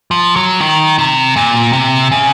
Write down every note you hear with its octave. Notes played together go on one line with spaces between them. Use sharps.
F3
F#3
D#3
C3
A#2
C3
C#3